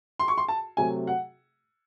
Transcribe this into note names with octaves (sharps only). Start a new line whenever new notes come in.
C6
C#6
C6
A5
C3 F#3 A3 G#5
F#5